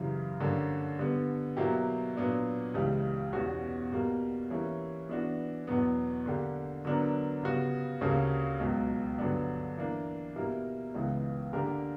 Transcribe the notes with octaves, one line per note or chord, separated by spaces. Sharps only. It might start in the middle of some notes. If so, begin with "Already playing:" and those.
Already playing: F#2 C#3 E3 G3
G2 D3 A#3 C#4 G4
D3 G3 B3
B2 F#3 A#3 E4 G4
A#2 F#3 B3 D4
C#2 C#3 E3 G3
E2 B2 G3 C#4 F#4
B2 G3 A#3
E3 G3 A#3 C#4
E3 B3 D4 F#4
E2 B2 F#3 B3
D3 A#3 D4 G4
D3 F#3 B3 D4 A#4
C#3 G3 B3 F#4
D2 C#3 G3 A#3 C#4
C#2 B2 F#3
G2 D3 F#3 B3 D4
E3 A#3 D4
B2 G3 A#3 E4 A#4
C#2 C#3 E3 B3
D3 A#3 D4 G4 A#4